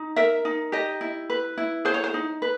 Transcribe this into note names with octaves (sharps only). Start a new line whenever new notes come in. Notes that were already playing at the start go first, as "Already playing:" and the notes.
Already playing: D#4
A#4 E5
D#4
G4 D#5
E4
B4
E4
G#4 C5
C#5
C5
D#4
B4